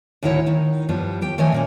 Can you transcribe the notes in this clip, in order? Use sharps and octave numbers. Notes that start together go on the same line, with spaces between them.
D2 A2 D#3 E4 C#5 F#5
D#3 D#4
G2 F3 G3 B3
D#2 G4 G5
D#3 F3 A3 C#5 D#5 G#5
A#2 A#3 C#4